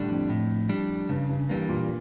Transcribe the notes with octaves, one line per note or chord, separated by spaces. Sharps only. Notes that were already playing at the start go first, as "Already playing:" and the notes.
Already playing: A2 D3 G3 D4
F2
A2
G3 D4
G2 C#3
G2
G2 E3 G3 A#3
A#2